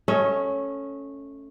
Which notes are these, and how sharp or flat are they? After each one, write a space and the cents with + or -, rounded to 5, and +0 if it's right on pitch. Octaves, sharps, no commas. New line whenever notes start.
A3 +0 C#4 +0 D#5 +40